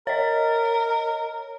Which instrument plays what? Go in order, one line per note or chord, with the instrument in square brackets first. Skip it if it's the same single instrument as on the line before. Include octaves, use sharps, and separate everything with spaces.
[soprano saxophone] A#4 [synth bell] C#5 D#5